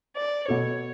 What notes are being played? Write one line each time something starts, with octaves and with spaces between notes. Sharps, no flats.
D5
B2 A4 C#5